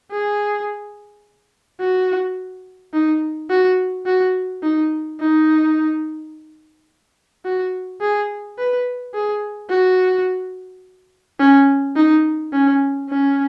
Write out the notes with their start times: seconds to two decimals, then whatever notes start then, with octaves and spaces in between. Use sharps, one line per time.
0.11 G#4
1.80 F#4
2.93 D#4
3.50 F#4
4.06 F#4
4.63 D#4
5.20 D#4
7.45 F#4
8.01 G#4
8.58 B4
9.14 G#4
9.70 F#4
11.39 C#4
11.96 D#4
12.53 C#4
13.09 C#4